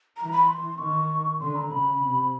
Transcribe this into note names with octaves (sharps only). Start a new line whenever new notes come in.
E3 A#5
B5
C6
D#3 C#6
D3 C6
A#5
C#3 B5
C3